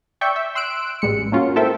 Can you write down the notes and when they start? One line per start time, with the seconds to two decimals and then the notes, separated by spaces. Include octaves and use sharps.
0.21 D5 E5 G5 C#6 G6
0.36 E5
0.55 C6 E6 F#6 D7
1.02 A1 G3 G#3 C#7
1.32 A#3 C#4 F4 F#4
1.56 E4 A4 A#4 C5 E5 G5